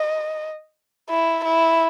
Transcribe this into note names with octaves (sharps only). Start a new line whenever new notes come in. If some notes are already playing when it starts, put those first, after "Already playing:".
Already playing: D#5
E4
E4